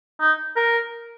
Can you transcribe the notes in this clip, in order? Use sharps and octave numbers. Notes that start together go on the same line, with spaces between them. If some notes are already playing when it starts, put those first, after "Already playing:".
D#4
A#4